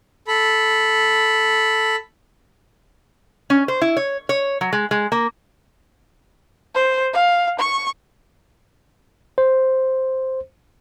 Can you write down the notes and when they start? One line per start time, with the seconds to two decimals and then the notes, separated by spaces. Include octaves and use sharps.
0.28 A4 B5
3.50 C#4
3.68 C5
3.82 E4
3.97 C#5
4.29 C#5
4.61 F#3
4.73 G#3
4.91 G#3
5.12 A#3
6.75 C5
7.13 F5
7.59 C#6
9.38 C5